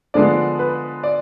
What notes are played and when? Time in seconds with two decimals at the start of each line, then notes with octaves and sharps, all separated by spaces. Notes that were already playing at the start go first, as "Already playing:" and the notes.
0.14 D3 F3 G#3 B3 D4 D5
0.59 B4
1.03 D5